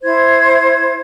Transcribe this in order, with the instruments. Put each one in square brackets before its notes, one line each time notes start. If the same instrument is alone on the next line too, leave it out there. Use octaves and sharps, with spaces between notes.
[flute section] E4 C5 G#6